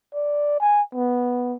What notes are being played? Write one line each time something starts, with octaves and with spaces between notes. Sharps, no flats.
D5
G#5
B3